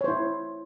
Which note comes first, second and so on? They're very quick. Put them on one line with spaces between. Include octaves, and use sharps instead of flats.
C#5 C5 E4